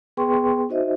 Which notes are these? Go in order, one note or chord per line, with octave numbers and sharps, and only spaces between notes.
B3 G#4 B4 G5 C6 C#6
D#4 F#4 C5 D#5 E5